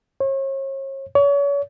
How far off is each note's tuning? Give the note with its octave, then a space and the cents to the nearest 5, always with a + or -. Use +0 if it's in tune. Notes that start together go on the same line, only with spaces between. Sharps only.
C#5 -40
C#5 +35